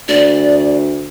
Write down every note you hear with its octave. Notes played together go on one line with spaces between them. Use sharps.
D2 D5